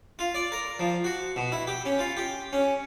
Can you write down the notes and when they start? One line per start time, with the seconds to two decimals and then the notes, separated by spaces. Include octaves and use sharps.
0.19 F4
0.35 D5
0.52 A#4
0.79 F3
1.04 F#4
1.36 B2
1.52 E4
1.67 G4
1.85 C#4
1.99 F4
2.17 G4
2.53 C#4